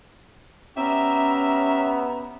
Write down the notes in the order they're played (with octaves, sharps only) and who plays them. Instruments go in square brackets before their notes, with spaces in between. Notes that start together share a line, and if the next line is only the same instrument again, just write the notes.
[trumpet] B3 [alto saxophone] C#4 [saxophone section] G4 D5 E5 [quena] A#5